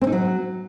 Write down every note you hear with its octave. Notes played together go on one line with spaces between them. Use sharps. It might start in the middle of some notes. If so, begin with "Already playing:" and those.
C4
D#4
F#3